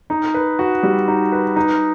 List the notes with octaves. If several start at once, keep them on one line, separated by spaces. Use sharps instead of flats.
D#4
B4
F#4
G3
D#4
B4
D#4